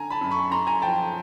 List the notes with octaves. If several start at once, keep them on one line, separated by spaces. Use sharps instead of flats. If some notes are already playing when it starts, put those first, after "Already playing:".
Already playing: D3 G#5 A#5
A5 B5
F#2
B5 C#6
F#2 A#5 C6
G#5 A#5
F3 G5 A5